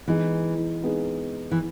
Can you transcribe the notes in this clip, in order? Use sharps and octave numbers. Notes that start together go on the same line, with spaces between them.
E3 G#3 B3 D#4 G#4
G#3 B3 D#4 G#4
E3